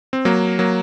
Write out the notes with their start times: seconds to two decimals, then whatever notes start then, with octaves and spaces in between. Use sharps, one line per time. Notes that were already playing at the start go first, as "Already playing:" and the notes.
0.13 C4
0.25 F#3 A#3
0.59 F#3 A#3